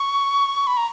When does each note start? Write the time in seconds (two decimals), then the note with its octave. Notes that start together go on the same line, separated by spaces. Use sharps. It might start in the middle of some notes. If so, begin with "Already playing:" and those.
Already playing: C#6
0.67 B5
0.77 A#5